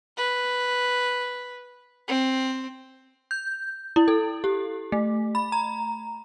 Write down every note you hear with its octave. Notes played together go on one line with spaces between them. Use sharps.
B4
C4
G6
E4
A4
G4
A3
B5
A#5